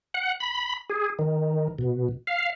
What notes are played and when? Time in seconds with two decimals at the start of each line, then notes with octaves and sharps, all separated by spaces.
0.14 F#5
0.40 B5
0.90 G#4
1.19 D#3
1.79 B2
2.27 F5